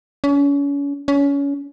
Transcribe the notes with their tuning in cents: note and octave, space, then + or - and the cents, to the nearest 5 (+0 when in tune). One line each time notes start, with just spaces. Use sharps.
C#4 +35
C#4 +25